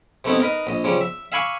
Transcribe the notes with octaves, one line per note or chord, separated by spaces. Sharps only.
C3 A3 B3 D#4 E4
D#4 A#4 B4 D#5
A#1 D#5
C#3 F3 G3
E5
E5 F5 G#5 B5 C#6 D6